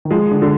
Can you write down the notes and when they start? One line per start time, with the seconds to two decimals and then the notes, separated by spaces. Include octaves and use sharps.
0.05 D#3
0.11 F3 G#3
0.31 D3
0.42 D3